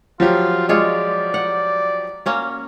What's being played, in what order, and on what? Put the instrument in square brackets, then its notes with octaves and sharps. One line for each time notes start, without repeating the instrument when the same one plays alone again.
[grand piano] F3 F#3 G4 [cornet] F4
[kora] G#3 F4 C#5 [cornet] D5
[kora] F#5
A#3 C#4 F#4